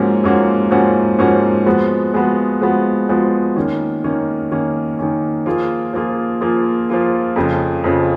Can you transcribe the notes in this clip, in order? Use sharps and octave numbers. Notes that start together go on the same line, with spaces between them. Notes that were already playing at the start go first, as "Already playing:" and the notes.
Already playing: G#2 F3 A#3 C#4 F#4
G#2 F3 A#3 C#4 F#4
G#2 F3 A#3 C#4 F#4
G#2 F3 A#3 C#4 F#4
F3 G#3 B3 F#4
F3 G#3 B3 F#4
F3 G#3 B3 F#4
F3 G#3 B3 F#4
D#3 A#3 C#4
D#3 A#3 C#4
D#3 A#3 C#4
D#3 A#3 C#4
F3 A#3 F4 G#4
F3 A#3 F4 G#4
F3 A#3 F4 G#4
F3 A#3 F4 G#4
F2 C#3 F3
F2 C#3 F3